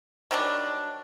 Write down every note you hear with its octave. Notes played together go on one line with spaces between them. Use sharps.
D#3 F#3 G3 D4